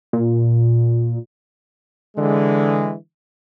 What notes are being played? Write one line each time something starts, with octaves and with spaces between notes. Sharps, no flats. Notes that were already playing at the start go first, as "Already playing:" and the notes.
A#2
D3 E3 G#3